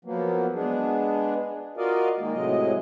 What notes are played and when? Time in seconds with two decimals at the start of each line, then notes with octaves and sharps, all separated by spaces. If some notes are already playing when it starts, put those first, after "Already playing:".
0.05 F3 F#3 A#3 B3
0.54 G#3 B3 D4 G#4
1.77 F4 F#4 A#4 D5 D#5 F5
2.18 D#3 G#3 A#3
2.33 A2 C3 F#3 G#3 D#5